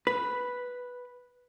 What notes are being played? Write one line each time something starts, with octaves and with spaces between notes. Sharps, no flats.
B4